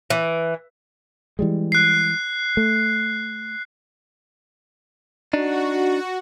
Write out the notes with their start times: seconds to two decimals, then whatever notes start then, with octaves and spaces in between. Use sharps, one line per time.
0.10 E3
1.39 E3 G3 G#3
1.72 F#6 C7
2.57 A3
5.33 D4 D#4 F#4